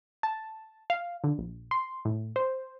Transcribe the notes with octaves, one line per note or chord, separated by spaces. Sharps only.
A5
F5
D3
A#1
C6
A2
C5